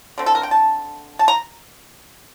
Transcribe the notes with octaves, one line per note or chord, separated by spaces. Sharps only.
D3 A3 C4
A4
A#4
G5
A5
A5
A#5